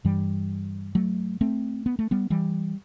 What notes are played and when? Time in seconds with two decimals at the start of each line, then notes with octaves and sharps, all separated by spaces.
0.05 G2 E3 G3
0.95 F#3 A3
1.41 A3 C4
1.86 B3
1.99 A3
2.11 G3 B3
2.30 E3 G3